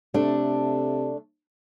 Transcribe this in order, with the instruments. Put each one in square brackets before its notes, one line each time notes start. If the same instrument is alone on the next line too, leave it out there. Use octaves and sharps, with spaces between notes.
[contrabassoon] C3 [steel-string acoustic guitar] A3 D4